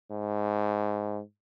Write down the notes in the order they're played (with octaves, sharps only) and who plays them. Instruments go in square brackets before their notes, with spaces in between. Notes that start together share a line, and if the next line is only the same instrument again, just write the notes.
[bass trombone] G#2